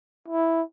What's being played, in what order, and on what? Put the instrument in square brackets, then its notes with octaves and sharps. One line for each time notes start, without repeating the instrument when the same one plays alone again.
[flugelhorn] E4